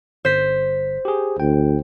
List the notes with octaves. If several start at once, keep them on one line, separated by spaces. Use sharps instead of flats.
G1 C5 B6
G4 G#4
D2 G5